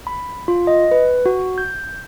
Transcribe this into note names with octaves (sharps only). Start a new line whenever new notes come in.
B5
F4
D#5
B4
F#4
G6